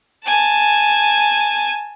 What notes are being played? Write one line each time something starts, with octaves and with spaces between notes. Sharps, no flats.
G#5 A5